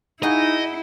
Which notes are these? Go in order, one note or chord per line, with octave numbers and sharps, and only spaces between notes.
D#4 E4 F#4 G#4 D#5